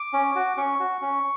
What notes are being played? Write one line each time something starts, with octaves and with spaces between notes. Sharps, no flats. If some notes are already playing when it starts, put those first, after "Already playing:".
Already playing: D6
C#4
F#4
C#4 C#6
F#4
C#4